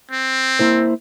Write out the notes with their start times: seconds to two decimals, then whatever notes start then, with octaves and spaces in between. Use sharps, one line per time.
0.11 C4
0.59 A#3 E4 C5